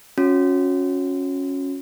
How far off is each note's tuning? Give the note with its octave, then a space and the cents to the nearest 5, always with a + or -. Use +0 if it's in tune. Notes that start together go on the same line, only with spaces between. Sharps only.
C#4 -5 F#4 -30